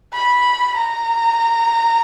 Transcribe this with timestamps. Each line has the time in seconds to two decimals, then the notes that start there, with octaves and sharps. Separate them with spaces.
0.13 B5
0.76 A#5